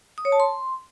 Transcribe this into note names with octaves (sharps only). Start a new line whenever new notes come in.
D#6
C#5
A5
C6